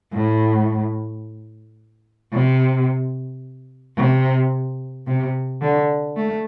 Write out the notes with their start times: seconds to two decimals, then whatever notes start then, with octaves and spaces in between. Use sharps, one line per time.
0.13 A2
2.33 C3
3.97 C3
5.07 C3
5.62 D3
6.16 A3